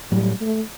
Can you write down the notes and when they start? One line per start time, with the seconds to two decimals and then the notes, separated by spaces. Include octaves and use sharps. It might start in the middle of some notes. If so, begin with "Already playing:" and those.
0.11 A2 F#3 G3 A3
0.41 A3